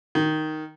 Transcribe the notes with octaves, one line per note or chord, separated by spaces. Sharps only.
D#3